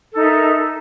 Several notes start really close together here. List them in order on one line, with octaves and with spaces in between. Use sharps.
A4 D#4 E5 A#4